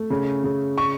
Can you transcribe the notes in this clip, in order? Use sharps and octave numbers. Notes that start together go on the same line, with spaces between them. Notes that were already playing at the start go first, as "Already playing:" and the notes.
Already playing: A3
C#3
C#3
C#6